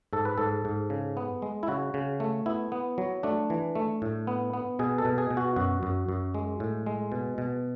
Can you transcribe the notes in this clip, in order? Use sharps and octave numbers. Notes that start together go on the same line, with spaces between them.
G#2 A4
B4
G#2 A4
G#2
C#3
B3
G#3
E4
C#3 F#4
C#3
A3
B3 E4
B3
F#3
A3 D4
E3
A3
A2
B3
B3
B2 G#4
A4
B2
G#4
B2
F#4
F#2 F#4
F#2
F#2
G#3
A2
G#3
B2
B2